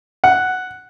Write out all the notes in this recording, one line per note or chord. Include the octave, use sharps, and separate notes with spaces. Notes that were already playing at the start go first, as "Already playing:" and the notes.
F#5